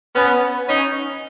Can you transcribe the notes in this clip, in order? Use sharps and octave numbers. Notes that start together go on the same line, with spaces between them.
B3 C#4
C#4 D#4